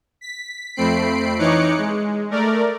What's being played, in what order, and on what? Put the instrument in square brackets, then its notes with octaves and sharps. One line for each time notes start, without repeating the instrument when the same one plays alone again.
[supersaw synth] B6
F2 A3 C4 B5 C7 D7
E3 D#4 C#5 D6 F#6 C#7
G#3
A3 A#4 D5